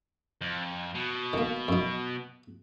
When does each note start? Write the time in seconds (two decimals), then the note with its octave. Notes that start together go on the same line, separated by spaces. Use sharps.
0.41 F2
0.95 B2
1.33 D#3 A#3
1.68 F#2 D#4